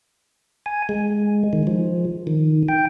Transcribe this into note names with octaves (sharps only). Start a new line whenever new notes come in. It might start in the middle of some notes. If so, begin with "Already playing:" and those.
G#5
G#3
D#3
F3
D#3
G5